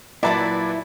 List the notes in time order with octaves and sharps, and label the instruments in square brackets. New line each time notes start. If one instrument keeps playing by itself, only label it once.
[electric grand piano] A#2 F#3 [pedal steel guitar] E4 [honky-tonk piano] B4 D5 [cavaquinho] E5 A5 A#5